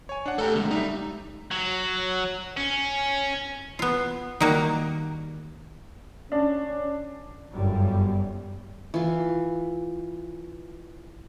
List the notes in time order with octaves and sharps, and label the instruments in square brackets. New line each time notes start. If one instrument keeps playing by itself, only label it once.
[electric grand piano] C#5 G#5
D4 F#5
[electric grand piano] A3 G4 [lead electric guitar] A4 A#5
[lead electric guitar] D3 G#3
[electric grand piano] G3 E5 [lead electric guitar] D#4
[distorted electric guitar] F#3
C#4
[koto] B3 F4
D#3 G3 A#3 F#4
[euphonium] C#4 [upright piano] D4
[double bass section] G1 F#2 G3
[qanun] E3 F4